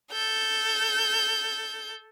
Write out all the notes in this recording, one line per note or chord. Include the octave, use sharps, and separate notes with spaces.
A4 G6